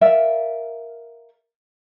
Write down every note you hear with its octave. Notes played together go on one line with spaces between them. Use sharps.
A#4 D5 E5 F5